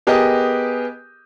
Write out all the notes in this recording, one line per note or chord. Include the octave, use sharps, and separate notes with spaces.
B3 G4 G#4 A#4 D#5